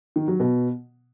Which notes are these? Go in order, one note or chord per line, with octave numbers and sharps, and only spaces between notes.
D#3
F#3
B2